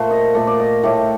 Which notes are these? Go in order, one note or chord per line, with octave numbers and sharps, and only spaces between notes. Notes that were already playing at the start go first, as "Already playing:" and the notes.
Already playing: A#2 A3 C5
D#5
A#2 A3 D5
D5
D#5
A2 A3 G4